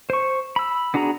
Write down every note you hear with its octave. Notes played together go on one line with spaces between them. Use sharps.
C5 C#6
B5 E6
B3 D4 F#4 G#4 A#5